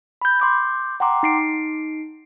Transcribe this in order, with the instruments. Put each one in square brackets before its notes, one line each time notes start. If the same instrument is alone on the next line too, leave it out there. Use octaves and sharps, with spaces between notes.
[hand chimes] B5 G6
C6 D6 G6
F#5 G5 A#5 C6 D6
D#4 C7 D7